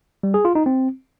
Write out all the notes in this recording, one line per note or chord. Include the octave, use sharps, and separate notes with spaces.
G3
G#4
F4
D#4
C4